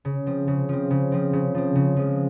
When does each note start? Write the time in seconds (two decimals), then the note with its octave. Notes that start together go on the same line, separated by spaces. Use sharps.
0.05 C#3
0.26 F3 C4
0.48 C#3
0.69 F3 C4
0.91 C#3
1.12 F3 C4
1.33 C#3
1.54 F3 C4
1.75 C#3
1.96 F3 G#3